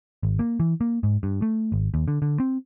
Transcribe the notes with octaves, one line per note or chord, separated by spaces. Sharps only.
G#1
A#3
E3
A#3
G#2
G2
A3
G#1
D#2
D3
D3
C4